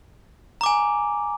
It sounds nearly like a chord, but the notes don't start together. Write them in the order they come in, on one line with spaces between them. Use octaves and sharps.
A#5 D6 G#5